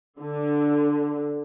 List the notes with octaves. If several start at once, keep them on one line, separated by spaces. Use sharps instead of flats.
D3